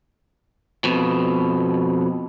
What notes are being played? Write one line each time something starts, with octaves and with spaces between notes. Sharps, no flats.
F2 B2